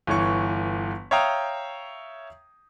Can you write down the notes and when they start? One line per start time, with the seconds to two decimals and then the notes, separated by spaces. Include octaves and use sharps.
0.07 G1 E3 C#5 C#6
1.11 C#5 E5 F5 G5 A#5 D#6